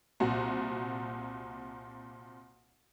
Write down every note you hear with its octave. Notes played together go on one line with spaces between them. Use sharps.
C2 A#2 F#4